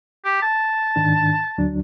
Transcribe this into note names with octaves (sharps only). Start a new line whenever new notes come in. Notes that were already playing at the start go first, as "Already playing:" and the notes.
G4
A5
G#2 D#3 D4
D2 F#3 D4